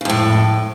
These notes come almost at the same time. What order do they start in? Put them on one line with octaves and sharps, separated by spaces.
C#3 F2 A2